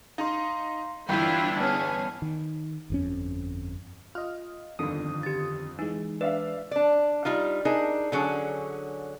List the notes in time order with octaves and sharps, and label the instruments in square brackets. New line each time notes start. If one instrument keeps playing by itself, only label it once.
[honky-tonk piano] D#4 [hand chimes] F5 A#5 C6
[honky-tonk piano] G1 E3 [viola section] D4 E4 [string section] F4 [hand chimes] G5 B5 G6
[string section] B3 C#4 G#4 [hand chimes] A5 F6
[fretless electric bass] D#3
G1 F2 C#4
[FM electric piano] F4 D#5 [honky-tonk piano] F6
[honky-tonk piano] G1 F2 [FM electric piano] D3 D#3 D#6
[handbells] G4 A6
[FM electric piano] E3 G#3 [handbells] D#4
[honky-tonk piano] D4 E5 F5 [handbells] B4
[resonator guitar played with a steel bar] D4 D5
G3 D#4 F4
D4 D#4 G#4 A#4
D3 F#3 C#4 G#4